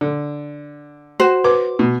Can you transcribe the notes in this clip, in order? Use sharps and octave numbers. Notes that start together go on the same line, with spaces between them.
D3
F#4 C5
B4 D6
B2